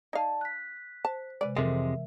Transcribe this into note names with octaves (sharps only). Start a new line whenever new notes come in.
D#4 D5 F5 A5
F#6 B6
C5 A5
C3 G#3 B4 D5
F2 C3 E3 G#3 A4 A#4 E5